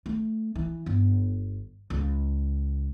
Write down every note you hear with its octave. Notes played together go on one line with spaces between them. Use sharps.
A3
E3
G1
C#2